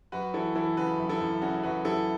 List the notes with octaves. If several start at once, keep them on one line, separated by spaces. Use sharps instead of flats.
F#2 F#4 B4
E3 E4 A4
E3 E4 A4
C#3 F#4 B4
F#2
E4 A4
F#2
C#3 C#4 F#4
F#2 F#4 B4
F#2 E4 A4